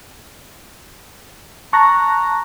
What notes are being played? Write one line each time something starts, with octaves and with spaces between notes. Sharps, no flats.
A5 A#5 C#6 F#6 A#6